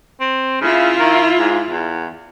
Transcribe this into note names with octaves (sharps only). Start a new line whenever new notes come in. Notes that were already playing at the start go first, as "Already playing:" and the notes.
C4
C#3 E4 F4
D#3
G#2
E2